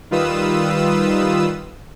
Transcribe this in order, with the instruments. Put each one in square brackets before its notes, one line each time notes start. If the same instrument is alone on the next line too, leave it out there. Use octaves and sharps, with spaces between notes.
[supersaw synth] D#3 G3 F4 B4 D#6 E6